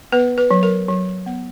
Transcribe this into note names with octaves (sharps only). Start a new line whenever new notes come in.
B3 B4
B4
F#3
A#4
F#3
B3